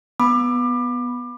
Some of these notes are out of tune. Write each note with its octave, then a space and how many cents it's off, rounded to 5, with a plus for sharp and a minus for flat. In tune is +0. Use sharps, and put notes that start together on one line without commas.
B3 +0 B5 +0 D6 +25